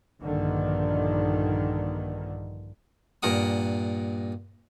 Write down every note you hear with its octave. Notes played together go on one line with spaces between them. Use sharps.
A#1 G2 D3 D#3
G2 A#2 A#4 F#5 D#6